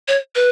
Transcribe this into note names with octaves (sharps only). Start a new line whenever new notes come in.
C#5
B4